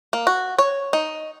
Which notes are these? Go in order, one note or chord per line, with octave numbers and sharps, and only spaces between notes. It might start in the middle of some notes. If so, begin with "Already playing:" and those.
A#3
F#4
C#5
D#4